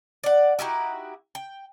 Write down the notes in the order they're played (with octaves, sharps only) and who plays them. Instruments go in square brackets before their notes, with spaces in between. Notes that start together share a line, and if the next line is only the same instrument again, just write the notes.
[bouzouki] D5 F#5
D#4 E4 F#4 G4
G5